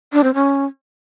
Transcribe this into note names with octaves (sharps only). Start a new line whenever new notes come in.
D4
C4
C#4